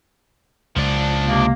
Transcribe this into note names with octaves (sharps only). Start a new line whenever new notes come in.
C#2 F3 D4
C3 G#3 A#3